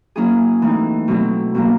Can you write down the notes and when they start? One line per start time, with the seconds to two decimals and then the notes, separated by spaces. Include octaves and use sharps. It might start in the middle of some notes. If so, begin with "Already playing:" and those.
0.16 F#3 A#3 C#4 E4 G#4
0.62 E3 A3 C4 D#4
1.08 B2 F#3 A3 C4 E4
1.55 B2 F#3 A#3 D4